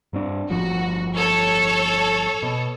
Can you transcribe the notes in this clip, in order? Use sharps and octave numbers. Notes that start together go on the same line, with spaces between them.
G2 C4 D4
G1 A2 F3 F#4
A4 C#5
B2